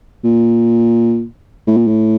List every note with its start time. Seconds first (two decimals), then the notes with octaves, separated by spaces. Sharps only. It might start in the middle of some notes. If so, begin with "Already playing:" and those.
0.24 A#2
1.67 A2
1.77 A#2
1.87 A2